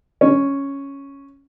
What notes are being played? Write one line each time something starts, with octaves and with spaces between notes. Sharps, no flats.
C#4